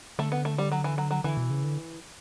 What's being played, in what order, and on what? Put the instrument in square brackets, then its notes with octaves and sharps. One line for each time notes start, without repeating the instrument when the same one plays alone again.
[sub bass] D3 [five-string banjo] A3
[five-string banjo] B3
A3
G3
F#3
E3
F#3
F#3
[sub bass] D3 [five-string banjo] E3
[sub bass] B2
C#3
D3